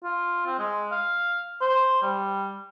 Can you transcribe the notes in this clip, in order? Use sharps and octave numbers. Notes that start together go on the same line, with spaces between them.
F4
C4
G#3
F5
C5
G3